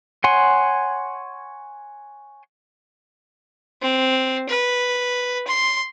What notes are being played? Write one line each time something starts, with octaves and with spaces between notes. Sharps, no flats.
C#5 F#5 G#5 C6
C4
B4
C6